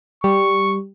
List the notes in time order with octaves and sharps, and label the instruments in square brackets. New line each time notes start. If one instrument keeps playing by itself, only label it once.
[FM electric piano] G3 [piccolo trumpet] C#6